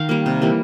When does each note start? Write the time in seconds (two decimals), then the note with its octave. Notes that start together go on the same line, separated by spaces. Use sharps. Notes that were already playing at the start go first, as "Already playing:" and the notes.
Already playing: D#3 F5
0.09 G3 A#3
0.26 C3
0.42 E3 G3 A#3